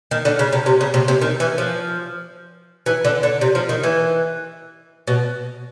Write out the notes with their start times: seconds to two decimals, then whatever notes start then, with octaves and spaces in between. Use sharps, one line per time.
0.11 D#3
0.25 D3
0.39 C#3
0.52 C3
0.66 C3
0.81 C#3
0.94 C3
1.08 C3
1.22 D#3
1.40 E3
1.58 F3
2.86 E3
3.05 D3
3.23 D3
3.41 C3
3.55 F3
3.69 D#3
3.83 E3
5.07 B2